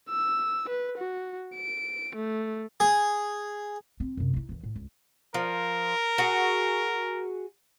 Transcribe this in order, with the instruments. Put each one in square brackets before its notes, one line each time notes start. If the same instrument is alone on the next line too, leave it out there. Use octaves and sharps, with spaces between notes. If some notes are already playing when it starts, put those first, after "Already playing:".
[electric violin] E6
B4
F#4
D7
A3
[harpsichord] G#4
[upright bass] C4
F#2 C3
D#4 E4
D#2 E3
A2
C#2
[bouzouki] F3 [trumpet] A#4
[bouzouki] F#4 G#4